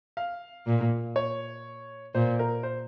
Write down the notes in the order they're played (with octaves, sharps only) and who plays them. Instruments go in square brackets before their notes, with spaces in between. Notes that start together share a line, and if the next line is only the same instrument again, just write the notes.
[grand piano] F5
[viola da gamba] A#2
[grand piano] C#5
[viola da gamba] A#2 [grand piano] C5
[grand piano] A#4
C5